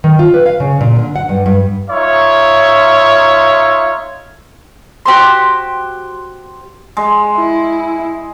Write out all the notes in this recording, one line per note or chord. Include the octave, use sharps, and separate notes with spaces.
D#3
F4
B4
F5
C#3
A#2
D3
F#5
G2
G2
D#4 F4 C#5 E5
F#4 G4 C5 C6
G#3
E4